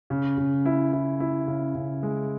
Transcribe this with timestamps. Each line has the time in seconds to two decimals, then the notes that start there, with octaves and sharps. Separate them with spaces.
0.10 C#3
0.38 C#3
0.66 E4
0.93 E4
1.20 E4
1.47 C#3
1.75 C#3
2.03 G#3